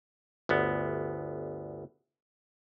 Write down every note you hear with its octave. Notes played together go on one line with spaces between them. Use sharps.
G1 D2 B3